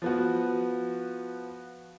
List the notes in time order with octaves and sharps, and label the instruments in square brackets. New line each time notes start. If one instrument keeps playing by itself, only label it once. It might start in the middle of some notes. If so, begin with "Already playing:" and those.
[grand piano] F3 B3 F#4